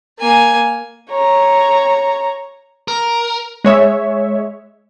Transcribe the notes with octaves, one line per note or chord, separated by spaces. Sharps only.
A#3 G#5
C#5 A#5
A#4
G#3 C#5 E5